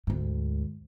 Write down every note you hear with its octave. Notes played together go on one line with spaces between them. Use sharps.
D2 G#2